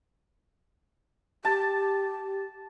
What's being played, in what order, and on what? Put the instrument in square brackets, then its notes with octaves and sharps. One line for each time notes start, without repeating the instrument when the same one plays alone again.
[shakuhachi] G4 [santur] A5